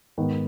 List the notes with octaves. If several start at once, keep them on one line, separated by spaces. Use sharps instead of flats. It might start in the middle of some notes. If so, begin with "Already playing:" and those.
G#2 D#3 B3